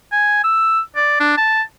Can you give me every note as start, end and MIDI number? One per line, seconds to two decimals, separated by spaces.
0.12 0.44 80
0.44 0.80 88
0.96 1.19 74
1.20 1.37 62
1.37 1.62 81